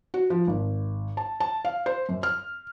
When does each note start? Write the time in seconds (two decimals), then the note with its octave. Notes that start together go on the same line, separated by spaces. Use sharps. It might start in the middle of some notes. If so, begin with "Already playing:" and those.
0.14 F#4
0.30 F3
0.47 G#1
1.17 A5
1.40 A5
1.65 F5
1.86 C5
2.09 F#2
2.23 F6